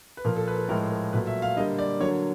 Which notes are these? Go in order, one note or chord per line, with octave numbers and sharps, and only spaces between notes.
B4
A#2 F3 A#3 A#4
A4
B4
A4
A2 F3 G#3 A#4
A#4
A#2 F#3 A3 B4
E5
F5
D3 G3 A#3 D#5
D5
D3 F#3 A#3 C#5